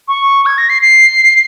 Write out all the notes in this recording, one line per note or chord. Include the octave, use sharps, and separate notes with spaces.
C#6
G#6
A#6
C7
C7